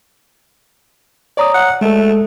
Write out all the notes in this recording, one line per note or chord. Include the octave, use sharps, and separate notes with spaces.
C#5 D5 A#5 D#6
F#5
G#3 A3 A4